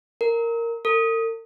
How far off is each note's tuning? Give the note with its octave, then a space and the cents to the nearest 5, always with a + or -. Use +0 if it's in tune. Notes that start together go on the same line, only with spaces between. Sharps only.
A#4 -10
A#4 -45